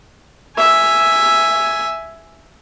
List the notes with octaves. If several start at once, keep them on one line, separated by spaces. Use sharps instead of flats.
E5 G#5